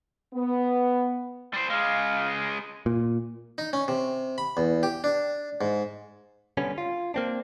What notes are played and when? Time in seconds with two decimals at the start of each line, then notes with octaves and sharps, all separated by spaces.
0.34 B3
1.54 G3 C5
1.70 C#3 G#3 F5
2.86 A#2
3.58 D#4
3.73 C#4
3.88 C3
4.38 B5
4.57 E2
4.83 G4
5.04 D4
5.61 G#2
6.57 D3 G3 B3 C#4
6.78 F4
7.14 A#3 C4 D4